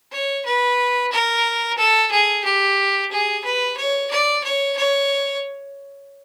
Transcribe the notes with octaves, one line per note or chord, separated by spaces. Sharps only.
C#5
B4
A#4
A4
G#4
G4
G#4
B4
C#5
D5
C#5
C#5